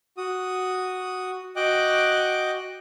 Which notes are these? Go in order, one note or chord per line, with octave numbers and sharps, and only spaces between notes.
F#4 D#6
F#4 D#5 G5 D6 F#6